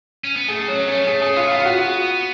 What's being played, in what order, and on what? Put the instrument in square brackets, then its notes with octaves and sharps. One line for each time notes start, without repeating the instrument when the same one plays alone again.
[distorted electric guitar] C#4
B3
[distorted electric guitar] A3 [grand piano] G#4
[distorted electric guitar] F#3 [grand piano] C#4
[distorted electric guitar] A3 [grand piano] C#4
[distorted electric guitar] B3
[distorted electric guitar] A3 [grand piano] G#4
[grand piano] G#4
[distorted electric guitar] B3 [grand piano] F4
[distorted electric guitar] A3
[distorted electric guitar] B3 [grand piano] F4
[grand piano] F#4